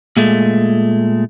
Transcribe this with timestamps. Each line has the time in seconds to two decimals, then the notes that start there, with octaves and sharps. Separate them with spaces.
0.17 A#2 G#3 A3